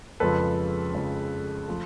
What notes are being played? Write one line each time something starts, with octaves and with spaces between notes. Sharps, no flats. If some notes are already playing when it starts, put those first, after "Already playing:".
F2 C#3 F3 G#3 A4 B4
F2 C#3 F3 G#3
F3 A3